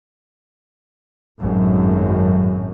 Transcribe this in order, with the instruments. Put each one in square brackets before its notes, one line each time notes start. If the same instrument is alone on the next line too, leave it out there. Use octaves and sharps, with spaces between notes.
[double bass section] G#1 F#2 A2